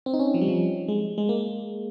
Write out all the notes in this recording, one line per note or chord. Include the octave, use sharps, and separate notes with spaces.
C4
D#4
C#4
F3
G3
F3
G#3
G#3
A#3